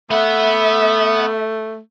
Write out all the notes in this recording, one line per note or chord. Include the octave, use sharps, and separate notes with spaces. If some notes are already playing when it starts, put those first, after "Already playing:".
A3 B3 E5 F#5